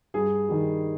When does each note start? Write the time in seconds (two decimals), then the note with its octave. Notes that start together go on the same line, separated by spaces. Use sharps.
0.14 G2 G#4
0.49 D#3 G3